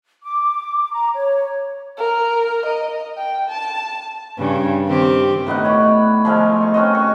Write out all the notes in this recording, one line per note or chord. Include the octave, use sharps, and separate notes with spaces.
D6
A#5
C#5
A#4
D#5
G5
A5
G2 C#3
D#3 C4 G4
A2 B3 D#4 F#5
C#5 D5 B5
F3 G#3 A3 F5
D#4 C#6
C4 C#4 F#4 D#5
C#6